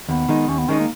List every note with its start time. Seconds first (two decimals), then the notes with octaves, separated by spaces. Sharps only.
0.09 D#2 B3
0.29 D#3 G#3 D#4
0.48 D#2 C#4
0.58 B3
0.69 D#3 G#3 C#4 D#4
0.79 A#3